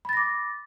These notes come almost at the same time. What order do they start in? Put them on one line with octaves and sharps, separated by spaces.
B5 A6 A#6 D6